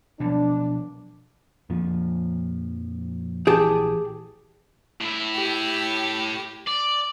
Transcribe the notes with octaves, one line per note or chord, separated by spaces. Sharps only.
B2 F3 F#3 D4
F2 A#2 F3
A#1 E3 G4 G#4 A5
A2 E4
G4
D5